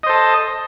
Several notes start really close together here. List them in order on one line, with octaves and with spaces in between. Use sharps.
D#5 C5 A4